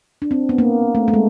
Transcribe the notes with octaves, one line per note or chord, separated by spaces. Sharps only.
D4
C4
B3
A#3
A3
A3
G#3